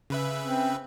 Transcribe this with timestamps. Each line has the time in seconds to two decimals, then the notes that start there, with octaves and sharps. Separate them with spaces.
0.10 C#3 B4 E5
0.42 C4